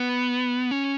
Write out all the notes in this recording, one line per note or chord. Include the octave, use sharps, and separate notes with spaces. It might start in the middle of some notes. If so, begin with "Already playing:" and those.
Already playing: B3
C#4